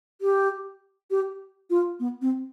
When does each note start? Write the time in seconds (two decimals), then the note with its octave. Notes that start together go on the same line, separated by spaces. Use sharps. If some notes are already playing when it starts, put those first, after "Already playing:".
0.21 G4
1.11 G4
1.70 F4
2.00 B3
2.22 C4